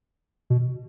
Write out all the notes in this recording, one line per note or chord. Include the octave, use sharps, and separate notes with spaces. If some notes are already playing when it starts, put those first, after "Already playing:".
B2